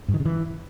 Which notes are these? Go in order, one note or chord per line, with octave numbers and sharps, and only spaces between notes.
G2
D#3
C#3
E3